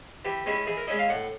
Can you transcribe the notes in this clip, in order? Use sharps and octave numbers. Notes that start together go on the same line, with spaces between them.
E3 G4
G#3 C#4 E4
E3 G#4
A#4
G#3 C#4 E4 D#5
F5
A2 F#5